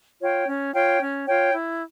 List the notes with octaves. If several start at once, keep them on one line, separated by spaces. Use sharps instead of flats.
F4 C#5 G5
C#4
F4 C#5 G5
C#4
F4 C#5 G5
E4